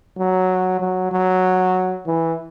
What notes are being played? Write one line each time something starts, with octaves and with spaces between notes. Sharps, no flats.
F#3
F#3
F#3
E3